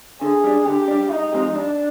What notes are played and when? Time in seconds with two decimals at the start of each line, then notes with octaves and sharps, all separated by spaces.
0.21 D3 G#4
0.44 G3 D4
0.66 D3 G4
0.88 G3 D4
1.10 G2 D#4
1.33 F3 G#3 C4 G4
1.55 G2 D4